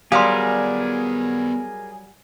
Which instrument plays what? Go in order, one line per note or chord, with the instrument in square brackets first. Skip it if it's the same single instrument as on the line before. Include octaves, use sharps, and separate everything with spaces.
[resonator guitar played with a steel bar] F#3 G3 [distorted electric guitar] B3 D5 [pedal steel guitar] G#4 A#4 [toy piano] F5 C6